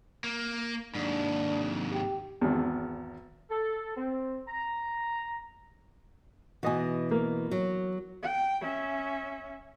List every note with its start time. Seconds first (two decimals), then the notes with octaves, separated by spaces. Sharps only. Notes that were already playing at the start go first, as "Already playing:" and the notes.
0.24 A#3
0.95 D#2 G#2 D4
1.93 G4
2.41 G#1 E2
3.50 A4
3.96 C4
4.48 A#5
6.63 B2 E3 F#4 D#5 G#5
7.11 A#3
7.51 F#3
8.22 G5
8.61 C#4 E5